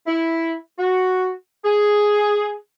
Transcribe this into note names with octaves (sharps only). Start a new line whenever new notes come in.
E4
F#4
G#4